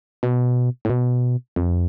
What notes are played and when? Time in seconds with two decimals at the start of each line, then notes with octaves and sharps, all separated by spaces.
0.23 B2
0.85 A2
0.90 B2
1.56 F2